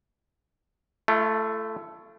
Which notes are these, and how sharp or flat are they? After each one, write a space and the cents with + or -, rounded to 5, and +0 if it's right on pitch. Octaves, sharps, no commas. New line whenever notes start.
A3 +0 F4 -45